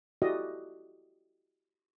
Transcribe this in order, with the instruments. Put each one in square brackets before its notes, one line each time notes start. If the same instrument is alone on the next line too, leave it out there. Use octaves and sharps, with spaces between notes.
[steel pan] E4 F#4 G4 A4 D5 D#5